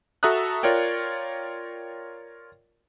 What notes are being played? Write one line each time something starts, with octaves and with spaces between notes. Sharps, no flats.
F#4 A4 E5 A#5 D#6 F#6
F4 A#4 C#5 D5 G5